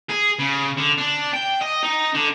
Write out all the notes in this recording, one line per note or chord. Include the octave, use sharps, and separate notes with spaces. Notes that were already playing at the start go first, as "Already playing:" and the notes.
G#4
C#3
D3
D4
G5
D#5
D#4
D3